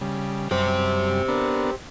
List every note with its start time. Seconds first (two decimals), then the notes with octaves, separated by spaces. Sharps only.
0.01 C#3 G3
0.51 F#2 G3 G4 C5
1.28 B3 D4 A#4